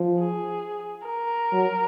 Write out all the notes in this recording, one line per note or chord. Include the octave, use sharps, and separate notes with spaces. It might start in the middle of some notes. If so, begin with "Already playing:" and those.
Already playing: F3
G#4
A#4
F#3